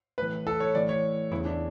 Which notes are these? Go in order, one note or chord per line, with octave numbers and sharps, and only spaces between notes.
A2 E3 B4
A4
C#5
A2 E3 D5
C#5
E2 C#3 E3 E4
D4